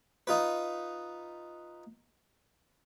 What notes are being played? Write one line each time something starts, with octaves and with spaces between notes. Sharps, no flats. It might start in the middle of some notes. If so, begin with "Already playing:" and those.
D#4 F4 B4